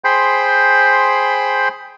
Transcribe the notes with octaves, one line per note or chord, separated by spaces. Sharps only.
G#4 C5 G5 B5 C6